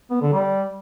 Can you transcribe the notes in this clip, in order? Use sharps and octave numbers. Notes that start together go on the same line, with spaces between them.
B3
D3
G3